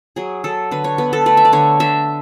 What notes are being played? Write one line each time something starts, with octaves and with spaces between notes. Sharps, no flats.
F#3 G#4
F#3 A4
D3 B4
C#5
B3 B4
A4
A3 B4
E5
D5
D3 C#5
D3 E5